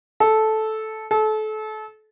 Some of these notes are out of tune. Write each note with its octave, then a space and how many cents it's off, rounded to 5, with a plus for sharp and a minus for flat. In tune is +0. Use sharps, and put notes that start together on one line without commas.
A4 -10
A4 -30